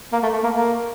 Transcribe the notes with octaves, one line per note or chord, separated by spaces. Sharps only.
A#3
A3
A3
A#3
A#3